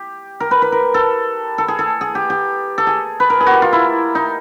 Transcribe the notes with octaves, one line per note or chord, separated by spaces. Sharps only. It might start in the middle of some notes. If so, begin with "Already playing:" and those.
Already playing: G4
A#4
B4
B4
A#4
A4
A4
G#4
A4
G#4
G4
G4
A4
G#4
B4
A#4
G#4
F#4 G4
F4
E4
D#4